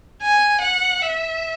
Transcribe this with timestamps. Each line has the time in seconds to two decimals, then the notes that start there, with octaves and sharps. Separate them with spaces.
0.22 G#5
0.62 F#5
1.02 E5